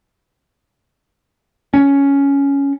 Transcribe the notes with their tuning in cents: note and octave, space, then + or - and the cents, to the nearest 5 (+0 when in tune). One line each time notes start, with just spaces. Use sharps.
C#4 +10